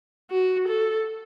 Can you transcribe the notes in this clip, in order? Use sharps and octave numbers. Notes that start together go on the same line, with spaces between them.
F#4
A4